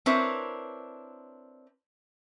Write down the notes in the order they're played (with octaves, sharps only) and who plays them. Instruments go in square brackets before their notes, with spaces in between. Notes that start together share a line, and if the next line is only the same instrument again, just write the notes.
[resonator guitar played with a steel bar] C4 D4 E4 A#4 B4 C#5